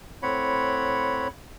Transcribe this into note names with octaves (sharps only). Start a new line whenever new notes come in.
A2 C4 C#5 F#5 B5